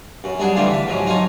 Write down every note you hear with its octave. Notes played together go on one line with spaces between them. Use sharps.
F#2
G3 D4 G#4 F#5
D3 E3 G3 A3 D4 F4
A5 B5
G#2 F3 F#3
D#4 F4 A4 C#5